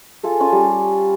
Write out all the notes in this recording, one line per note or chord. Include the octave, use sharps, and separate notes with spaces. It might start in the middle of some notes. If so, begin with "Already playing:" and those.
F4 G#4 A4
C#4 F4 G#5
G3